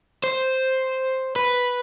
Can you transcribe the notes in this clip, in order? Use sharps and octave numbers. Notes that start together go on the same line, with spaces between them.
C5
B4